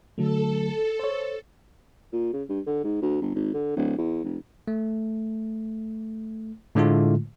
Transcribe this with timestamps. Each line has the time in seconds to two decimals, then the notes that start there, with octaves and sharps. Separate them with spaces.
0.18 D3 F#3 A3 A4
0.99 C5 C#5
2.13 A#2
2.33 C#3
2.49 G2
2.67 D3
2.84 G#2
3.02 D2
3.22 G1
3.35 G#1
3.54 D3
3.76 D1
3.98 E2
4.24 F1
4.68 A3
6.75 A2 D3 G#3 A3 F4